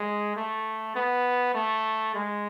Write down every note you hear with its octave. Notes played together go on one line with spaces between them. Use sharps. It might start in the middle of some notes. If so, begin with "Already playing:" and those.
Already playing: G#3
A3
B3
A3
G#3